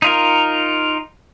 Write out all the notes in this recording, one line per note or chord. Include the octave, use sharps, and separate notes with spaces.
D#4 F4 A#4